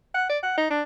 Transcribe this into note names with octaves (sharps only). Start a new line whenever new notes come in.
F#5
D5
F#5
D#4
D4